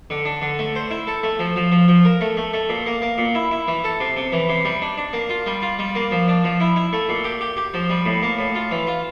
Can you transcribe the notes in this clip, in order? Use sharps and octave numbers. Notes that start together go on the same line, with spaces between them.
D3
D4
D3
A3
C5
E4
A4
A3
F3
F3
F3
F3
A#4
A3
A3
A3
A#2
A#3
A#3
A#2
E4
E4
E3
A4
C3
C3
E3
C3
G3
D4
D4
A#3
F4
G3
F4
G3
A#3
F3
D4
F3
E4
E4
A3
A#2
G4
G4
G4
F3
G3
A2
A#3
A2
F4
E3
F4